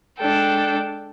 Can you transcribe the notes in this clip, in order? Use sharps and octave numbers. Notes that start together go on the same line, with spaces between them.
G#3 D4 A4 G5